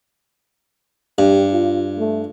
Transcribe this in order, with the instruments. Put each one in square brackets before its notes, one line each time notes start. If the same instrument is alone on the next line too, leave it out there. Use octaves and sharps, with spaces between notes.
[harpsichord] G2 [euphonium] G4
[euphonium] F4
A3